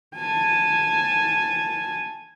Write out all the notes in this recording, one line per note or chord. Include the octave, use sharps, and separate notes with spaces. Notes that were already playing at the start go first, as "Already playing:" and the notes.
G#5 A5